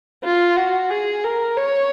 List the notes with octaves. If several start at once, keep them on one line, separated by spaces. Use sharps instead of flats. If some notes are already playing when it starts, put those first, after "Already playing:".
F4
F#4
G#4
A#4
C#5